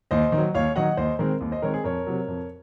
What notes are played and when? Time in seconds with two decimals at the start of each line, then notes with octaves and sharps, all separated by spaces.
0.11 D#2 C5 D#5
0.32 D#3
0.38 F#3
0.55 D#2 C#5 F5
0.76 D#3 F#3 D#5 F#5
0.97 D#2 C5 D#5
1.19 D#3 G#3 C4 A#4
1.41 D#2
1.52 C5 D#5
1.62 D#3 G#3 C4 A#4 C#5
1.74 G#4
1.84 F2 A#4 C#5
2.07 C3 F#3
2.28 F2